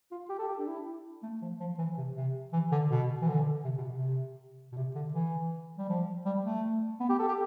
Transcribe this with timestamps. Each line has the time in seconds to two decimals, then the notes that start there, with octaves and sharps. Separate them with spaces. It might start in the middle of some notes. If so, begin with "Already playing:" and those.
0.12 F4
0.29 G4
0.39 A4
0.48 G4
0.59 D4
0.68 E4
1.23 A3
1.42 F3
1.60 F3
1.78 E3
1.98 C3
2.16 C3
2.53 E3
2.72 D3
2.91 B2
3.22 E3
3.28 D3
3.65 C3
3.78 B2
3.90 C3
4.72 B2
4.77 C3
4.95 D3
5.14 E3
5.78 G3
5.89 F3
6.26 G3
6.44 A3
7.00 B3
7.09 G4
7.19 A4
7.28 G4